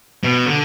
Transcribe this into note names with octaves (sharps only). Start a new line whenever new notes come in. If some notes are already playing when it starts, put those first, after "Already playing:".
B2
D3